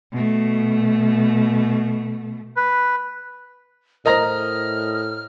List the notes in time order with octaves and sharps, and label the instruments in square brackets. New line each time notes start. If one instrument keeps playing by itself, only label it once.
[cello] B2 A3
[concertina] B4
[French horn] A2 [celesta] A#4 C5 [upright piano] D#5 A#5 A#6 [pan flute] F6